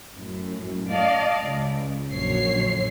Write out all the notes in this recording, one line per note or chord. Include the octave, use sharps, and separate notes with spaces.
F#2 A2
D5 D#5 F5 A5
C#2
A#1 F#2 D3 C#5 C7